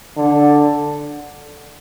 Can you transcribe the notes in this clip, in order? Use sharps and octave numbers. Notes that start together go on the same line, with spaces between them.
D3